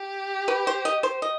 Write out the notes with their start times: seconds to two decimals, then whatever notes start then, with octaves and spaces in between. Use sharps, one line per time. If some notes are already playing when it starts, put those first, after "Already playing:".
Already playing: G4
0.48 B4
0.67 C5
0.85 D#5
1.03 C5
1.22 D#5